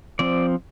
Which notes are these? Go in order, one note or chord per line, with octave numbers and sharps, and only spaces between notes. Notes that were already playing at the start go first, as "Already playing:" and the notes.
F3 C4 D5